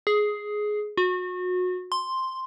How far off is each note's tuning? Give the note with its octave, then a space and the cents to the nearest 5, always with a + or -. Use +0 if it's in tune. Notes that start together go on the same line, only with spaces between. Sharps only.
G#4 +10
F#4 -30
C6 +0